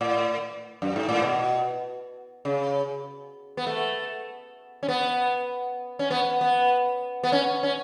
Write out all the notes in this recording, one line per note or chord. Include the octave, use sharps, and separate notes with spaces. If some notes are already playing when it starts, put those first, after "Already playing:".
A2
F#2
G#2
A2
B2
C#3
B3
A3
C#4
B3
C#4
B3
B3
B3
C#4
C#4